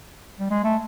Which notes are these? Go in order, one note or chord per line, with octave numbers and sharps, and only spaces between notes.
G3
G#3
A3